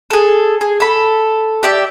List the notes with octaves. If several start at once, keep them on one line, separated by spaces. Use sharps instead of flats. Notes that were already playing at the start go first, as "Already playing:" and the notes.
G#4 A4
G#4
A4 B5
G4 D5 E5